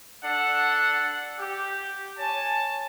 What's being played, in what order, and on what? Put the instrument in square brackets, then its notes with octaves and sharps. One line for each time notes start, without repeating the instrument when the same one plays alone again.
[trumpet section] D4 A4 F#5
G4
C#5 G#5 A5